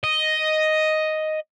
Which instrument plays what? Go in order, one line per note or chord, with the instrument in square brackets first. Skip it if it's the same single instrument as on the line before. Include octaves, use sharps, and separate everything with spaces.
[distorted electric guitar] D#5